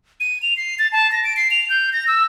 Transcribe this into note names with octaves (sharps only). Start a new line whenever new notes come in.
D#7
F7
C7
A6
A5
A#6
D7
C7
F7
G6
A#6
E6